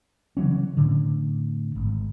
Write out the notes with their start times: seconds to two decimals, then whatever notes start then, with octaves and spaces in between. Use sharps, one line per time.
0.37 C#3 E3 F#3 C#4
0.77 A2 D3
1.75 G#1